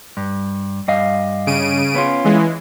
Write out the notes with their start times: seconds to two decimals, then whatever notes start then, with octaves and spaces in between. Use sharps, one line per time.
0.17 G2
0.88 G2 D#5 F5
1.47 C#3 D7 D#7
1.94 B3 C#4 F4
2.24 E3 G#3